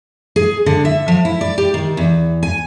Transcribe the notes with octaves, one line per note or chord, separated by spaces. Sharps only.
G#4
D3
E5
F3
E4
D5
G4
D#3
E2
G#5